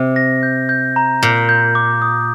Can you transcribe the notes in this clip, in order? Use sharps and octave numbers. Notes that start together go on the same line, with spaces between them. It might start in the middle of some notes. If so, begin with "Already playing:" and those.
Already playing: C3
A#6
G6
G6
A#5
A#2 G6
G6
D6
D#6